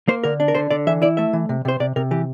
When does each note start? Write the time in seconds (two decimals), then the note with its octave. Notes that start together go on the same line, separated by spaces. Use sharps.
0.08 A#3 C5
0.24 D3 A#4
0.40 D4
0.48 A#4
0.55 D3 C5
0.70 D3 D5
0.87 E3 E5
1.02 E4 D5
1.17 A3 E5
1.33 E3
1.49 C3
1.65 C3 C5
1.80 C3 D5
1.96 C3 A#4
2.11 E3 G4